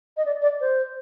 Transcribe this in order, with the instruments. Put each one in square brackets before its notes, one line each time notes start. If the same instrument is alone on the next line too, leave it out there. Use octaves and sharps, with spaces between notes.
[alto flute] D#5
D5
D5
C5